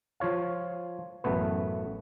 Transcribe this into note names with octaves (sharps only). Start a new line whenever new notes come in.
F3 F4 C#5 F5
A1 F#2 A3 B3 B4